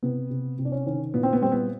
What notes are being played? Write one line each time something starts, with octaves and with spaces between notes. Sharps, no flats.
C3 B3
C3
C3
D4
C#4
D#3 C#4
A#2 B3
C4
B3
G3 C4
B3